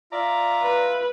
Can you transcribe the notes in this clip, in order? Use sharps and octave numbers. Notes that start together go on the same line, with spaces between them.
F4 D5 E5 A#5
B4